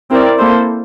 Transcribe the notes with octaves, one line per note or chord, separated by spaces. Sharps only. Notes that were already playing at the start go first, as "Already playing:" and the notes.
C4 E4 A#4 D5
A#3 E4 A4 C5